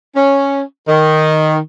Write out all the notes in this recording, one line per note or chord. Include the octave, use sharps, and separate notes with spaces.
C#4
D#3